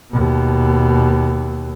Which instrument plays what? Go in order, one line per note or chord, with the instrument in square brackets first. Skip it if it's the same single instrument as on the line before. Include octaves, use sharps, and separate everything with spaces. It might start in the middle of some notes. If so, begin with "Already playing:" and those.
[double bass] D#2 B2